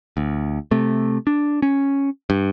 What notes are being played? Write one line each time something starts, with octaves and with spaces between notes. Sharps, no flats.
D2
C3 A3
D4
C#4
G2